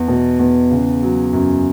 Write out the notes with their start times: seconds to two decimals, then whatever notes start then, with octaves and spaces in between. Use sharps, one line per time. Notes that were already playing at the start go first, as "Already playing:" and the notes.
Already playing: E2
0.08 B2
0.39 E2
0.71 C#3
1.02 F#3
1.33 F#2